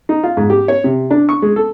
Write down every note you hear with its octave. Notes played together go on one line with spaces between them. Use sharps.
D#4
F4
G#2
G4
C#5
C3
D4
C#6
G#3
A4